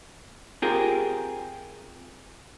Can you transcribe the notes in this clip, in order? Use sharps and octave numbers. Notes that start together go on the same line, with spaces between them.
C4 F4 G4 G#4 A#4